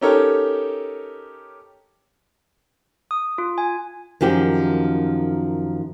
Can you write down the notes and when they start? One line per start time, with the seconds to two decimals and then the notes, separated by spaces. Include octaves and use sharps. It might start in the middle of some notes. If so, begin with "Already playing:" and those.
0.01 C#4 D#4 G4 A4 A#4 C#5
3.11 D#6
3.38 F4
3.58 G#5
4.21 F#2 D#3 F3 G4